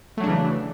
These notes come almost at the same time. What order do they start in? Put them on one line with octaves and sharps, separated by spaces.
A3 F#3 D4 C#3 E3